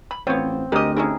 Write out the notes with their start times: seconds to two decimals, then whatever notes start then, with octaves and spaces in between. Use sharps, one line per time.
0.11 B5
0.27 A1 F3 B3 C4 C#5
0.72 D2 G#3 G4 A#4 D#5
0.97 C#4 D#4 E4 G#4 A#4